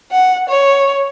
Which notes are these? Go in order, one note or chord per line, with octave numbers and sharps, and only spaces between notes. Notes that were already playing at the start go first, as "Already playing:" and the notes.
F#5
C#5